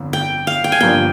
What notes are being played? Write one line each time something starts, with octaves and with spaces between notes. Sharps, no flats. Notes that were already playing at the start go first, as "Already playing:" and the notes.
Already playing: G1 F2 D3
G5
F5
G5
G#5
G1 G2 F3 A#3 G5